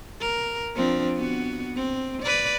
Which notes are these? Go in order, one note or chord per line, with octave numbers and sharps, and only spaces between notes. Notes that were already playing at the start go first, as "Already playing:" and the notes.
A#4
F3 C4 D4
B3 F#4
C4
B4 D5